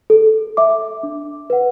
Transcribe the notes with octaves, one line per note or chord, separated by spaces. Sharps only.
A4
E5 D6
D4
B4 F#5